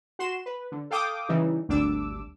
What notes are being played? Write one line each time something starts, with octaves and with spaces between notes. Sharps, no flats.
F#4 C6 E7
B4
D3
A4 F5 G5 D6 D#6
C#3 E3 G3 D#4
G#1 D2 G3 D4 D6 E6